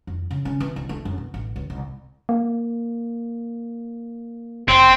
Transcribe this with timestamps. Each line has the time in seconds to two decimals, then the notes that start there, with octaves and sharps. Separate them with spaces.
0.07 F2
0.31 C#3
0.45 C#4
0.60 E3
0.76 C2
0.89 A3
1.05 F#2
1.18 B2
1.34 A1
1.56 C#2
1.70 C2
2.29 A#3
4.68 F#1 C4